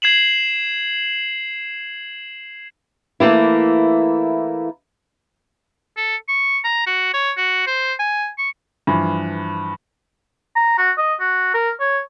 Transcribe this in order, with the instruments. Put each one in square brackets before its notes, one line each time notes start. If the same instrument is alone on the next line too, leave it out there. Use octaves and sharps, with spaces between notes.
[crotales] G#6 C7 E7 F#7
[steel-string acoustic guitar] E3 A3 A#3 E4
[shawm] A4
C#6
A#5
F#4
C#5
F#4
C5
G#5
C#6
[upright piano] G2 E3 F3
[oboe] A#5
F#4
D#5
F#4
A#4
C#5